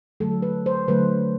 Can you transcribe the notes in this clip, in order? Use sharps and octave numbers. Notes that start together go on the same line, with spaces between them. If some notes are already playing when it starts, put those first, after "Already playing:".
D3 F#3 A3 A4
B4
C5
D3 F#3 A3 B4